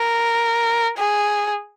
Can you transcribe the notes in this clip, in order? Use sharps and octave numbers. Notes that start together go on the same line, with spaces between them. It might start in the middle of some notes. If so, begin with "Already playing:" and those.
Already playing: A#4
G#4